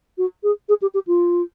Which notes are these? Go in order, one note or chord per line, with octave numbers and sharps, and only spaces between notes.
F#4
G#4
G#4
G4
G4
F4